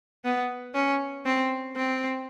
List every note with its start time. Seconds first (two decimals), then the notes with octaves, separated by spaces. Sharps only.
0.25 B3
0.75 C#4
1.26 C4
1.76 C4